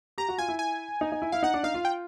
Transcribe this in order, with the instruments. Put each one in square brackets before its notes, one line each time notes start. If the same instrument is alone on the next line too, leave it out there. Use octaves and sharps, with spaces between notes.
[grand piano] G4 [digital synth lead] A#5
[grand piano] F#4
[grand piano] F4 [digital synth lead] G#5
[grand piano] E4
[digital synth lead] G#5
[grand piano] D#4
D#4
E4
[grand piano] E4 [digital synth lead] F5
[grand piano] D#4 [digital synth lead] F#5
[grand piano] D4
[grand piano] D#4 [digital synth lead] F5
[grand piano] F4
[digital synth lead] G5